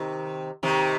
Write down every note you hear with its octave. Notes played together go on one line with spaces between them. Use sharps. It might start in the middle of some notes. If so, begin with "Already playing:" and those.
Already playing: C3 D#3
C3 D#3